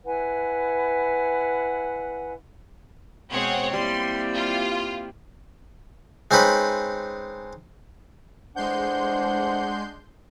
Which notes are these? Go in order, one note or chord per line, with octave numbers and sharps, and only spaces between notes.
E4 B4 F#5 G#5
B2 G#3 C4 G#4 C#5 F#5
G3 A#3 C4 E4 C6
F4
G#3 C4 C#4 D#4 B4
E3 G#3 A3 D4 C5 F#5 C6 G6